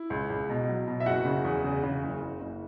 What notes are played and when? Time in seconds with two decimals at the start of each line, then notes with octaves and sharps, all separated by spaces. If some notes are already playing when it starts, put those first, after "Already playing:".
Already playing: E4
0.10 C#2
0.30 C#2
0.50 B2
0.68 F#3
0.88 B2
1.00 E5
1.06 F#1 F#4 F#5
1.25 C#3
1.45 E2
1.64 C#3
1.83 C#3
2.03 F#1
2.22 F#1
2.41 F#1